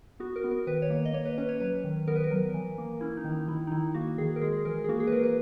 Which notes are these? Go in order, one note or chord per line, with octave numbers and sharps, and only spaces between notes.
B3 F#4
A#4
B3
A#4
D#3 B4
C#5
A#3
D#5
A#3 C#5
B4
C#4 B4
C#5
F#3 B4
D#3
B3 A#4
B4
A#4
F#3
E3
A#3
C#4 E4
D#4
D#3
D#4
D#3 E4
D#4
D#3 E4
A#3 F#4
D#3 G#4
A#4
G#3 G#4
E3 A#4
G#4
A#3 F#4
G#4
B4
A#3 A#4
B4